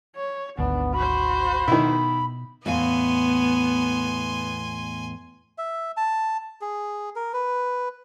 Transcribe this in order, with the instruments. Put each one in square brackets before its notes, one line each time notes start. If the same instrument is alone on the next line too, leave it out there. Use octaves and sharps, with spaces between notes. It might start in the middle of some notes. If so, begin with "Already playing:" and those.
[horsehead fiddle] C#5
[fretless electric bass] G#1 D2 [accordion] B3 [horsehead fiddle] D4
[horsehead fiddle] F#4 C5 [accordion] B5
[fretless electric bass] B2 [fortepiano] D#3 E4
[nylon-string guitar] E2 A2 F5 [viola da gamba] B3 [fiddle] G#5 C6
[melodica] E5
A5
G#4
A#4
B4